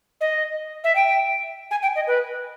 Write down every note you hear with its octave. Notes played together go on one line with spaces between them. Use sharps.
D#5
E5
G5
G#5
G5
D#5
B4